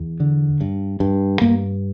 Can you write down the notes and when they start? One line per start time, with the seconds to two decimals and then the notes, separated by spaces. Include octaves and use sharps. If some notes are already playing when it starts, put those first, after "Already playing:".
Already playing: E2
0.20 D3
0.61 G2
1.00 G2
1.41 G2 A#3